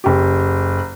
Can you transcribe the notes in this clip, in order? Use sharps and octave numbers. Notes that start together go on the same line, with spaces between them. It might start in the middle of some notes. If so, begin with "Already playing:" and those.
F#1 G4